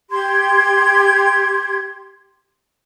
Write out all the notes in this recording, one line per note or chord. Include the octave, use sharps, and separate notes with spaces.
G4 C6 G#6